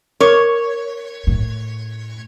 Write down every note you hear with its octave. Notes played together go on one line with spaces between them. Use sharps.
A#4 C#5 D6
A2